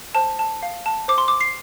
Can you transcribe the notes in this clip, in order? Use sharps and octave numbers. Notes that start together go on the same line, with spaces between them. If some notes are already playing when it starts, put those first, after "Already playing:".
C5 A5
A5
F5
A5
C5 D6
C6
D6
C7